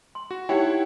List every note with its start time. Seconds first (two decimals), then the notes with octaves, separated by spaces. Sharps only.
0.15 C6
0.31 F#4
0.49 D#4 E4 G4 C#5 F#5 G5